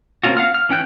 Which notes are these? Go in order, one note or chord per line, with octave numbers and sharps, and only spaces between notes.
A#3 C4 C#4 F4 F#4
F5 F#5 F6
F6
E3 C#4 G5 F#6 G6